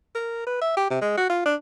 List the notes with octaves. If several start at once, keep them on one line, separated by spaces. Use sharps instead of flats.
A#4
B4
E5
G4
C3
G#3
F#4
F4
D4